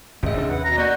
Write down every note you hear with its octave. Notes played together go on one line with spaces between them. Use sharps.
D#1 G#1 D2 G#3 C#4 E5
D2 C3 D4
D#2 B4 F#5
B2 A#5
A#3 F#4 D5 F#5 G6